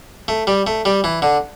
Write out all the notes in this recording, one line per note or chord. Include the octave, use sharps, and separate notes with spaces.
A3
G3
A3
G3
E3
D3